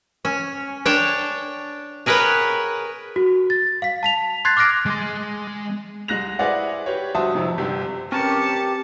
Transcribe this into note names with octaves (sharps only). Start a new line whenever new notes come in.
C#4
D4 C#5 G5 A5
G#4 A#4 B4 C#5 F#5 G5
F#4
A6
F5 B6
A5 B6 F7
C6 F#6 G#6 A6 C7
D6 F6 F#6 A#6 D7
G#3 C6
C2 G#3 F#6 A#6 F7
E4 G#4 B4 C5 D5 F#5
G4 B4 C#5
G1 F#4 C5 E5 A5 D#6
F2 G#2 C3 F3
G1 C3 G4
C4 C#4 G4 A#4 B4 A5 C#7